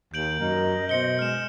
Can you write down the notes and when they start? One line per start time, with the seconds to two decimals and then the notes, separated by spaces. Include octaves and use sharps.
0.14 D#2 G6 D7 F#7
0.40 F#2 A#4 D#5
0.89 B2 C5 C#7 G7
1.19 G#3 F6 E7